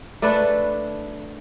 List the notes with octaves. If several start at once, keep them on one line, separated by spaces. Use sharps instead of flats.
A3 D4 A4 B4